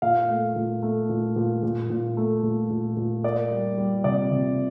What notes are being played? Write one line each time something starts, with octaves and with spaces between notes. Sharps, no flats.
A#2 F5
A3
A#2
A3
A#2
A#2
A#2
A#2
A3
A#2
A#2
A#2
A#3 D5
G3
G3
C3 D5
C3